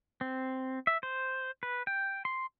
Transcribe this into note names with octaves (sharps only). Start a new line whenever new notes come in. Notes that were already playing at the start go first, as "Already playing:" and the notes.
C4
E5
C5
B4
G5
C6